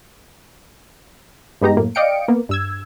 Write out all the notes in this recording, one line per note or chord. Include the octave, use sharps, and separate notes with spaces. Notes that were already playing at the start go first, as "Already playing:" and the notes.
G2 G#3 B3 D#4 G4 A#5
F#2 A2 A#3
D5 D#5 F5 G5 C#7 D7
A#3 B3
G2 E6 G#6